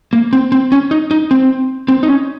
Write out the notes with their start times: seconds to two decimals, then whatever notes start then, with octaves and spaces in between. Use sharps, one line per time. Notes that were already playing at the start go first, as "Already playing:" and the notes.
0.13 A#3
0.33 C4
0.52 C4
0.72 C#4
0.91 D#4
1.11 D#4
1.31 C4
1.88 C4
2.03 D#4
2.09 C#4